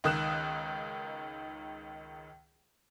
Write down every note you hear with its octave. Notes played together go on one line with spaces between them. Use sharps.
C#2 D#3 D#6 F#6 E7